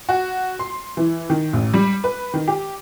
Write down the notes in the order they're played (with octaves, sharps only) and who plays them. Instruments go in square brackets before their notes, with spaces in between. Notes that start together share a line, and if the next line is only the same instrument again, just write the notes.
[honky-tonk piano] F#4
C6
E3
D#3
A1
G3
B4
D#3
G4